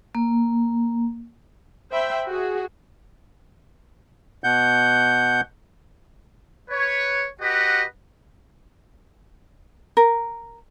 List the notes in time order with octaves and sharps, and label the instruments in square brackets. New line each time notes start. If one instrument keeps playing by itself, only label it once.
[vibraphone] A#3
[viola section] C5 E5 G5 B5
F#4 G#4
[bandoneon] B2 F#5 G6
[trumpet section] B4 C#5
F#4 G4 B4 D#5 F#5
[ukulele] A#4